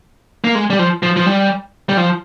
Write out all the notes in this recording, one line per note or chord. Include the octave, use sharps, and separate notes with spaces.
A#3
G#3
G3
F3
F3
F3
G3
G3
F3